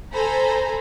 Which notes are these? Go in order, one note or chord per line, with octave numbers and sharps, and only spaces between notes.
A4 C5 G#5 A#5 B5